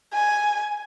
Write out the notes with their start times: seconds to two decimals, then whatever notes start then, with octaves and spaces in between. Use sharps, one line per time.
0.13 G#5